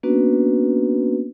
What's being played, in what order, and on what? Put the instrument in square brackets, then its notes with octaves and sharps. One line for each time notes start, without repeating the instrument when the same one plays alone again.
[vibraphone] A#3 B3 C#4 D4 F#4 B4